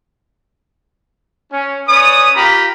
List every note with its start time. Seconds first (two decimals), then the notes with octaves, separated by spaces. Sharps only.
1.53 C#4
1.89 C#4 B4 D5 D#6
2.36 A#3 F4 G4 A#5 B5